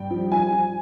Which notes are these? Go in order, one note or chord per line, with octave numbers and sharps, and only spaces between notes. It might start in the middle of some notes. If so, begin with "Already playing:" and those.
Already playing: G2 G5
F3
F3 G#5
F3